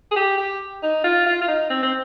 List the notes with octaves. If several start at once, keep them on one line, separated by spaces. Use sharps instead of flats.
G#4
G4
G4
D#4
F4
F4
F4
D#4
C4
C4